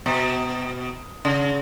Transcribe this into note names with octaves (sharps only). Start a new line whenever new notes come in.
B2
C#3